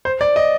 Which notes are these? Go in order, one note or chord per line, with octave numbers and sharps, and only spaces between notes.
C5
D5
D#5